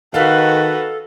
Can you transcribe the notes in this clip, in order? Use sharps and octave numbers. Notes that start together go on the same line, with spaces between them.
D#3 F#4 A4 B4 F5 B6